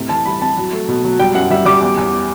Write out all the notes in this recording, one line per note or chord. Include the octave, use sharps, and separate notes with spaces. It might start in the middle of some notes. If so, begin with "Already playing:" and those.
Already playing: A2 C3
E3 A5
G3 B5
C3 A5
F#3
A3
B2
F#3
G3 G5
F#2 F#5
G3 E5
G3 D6
E2
E2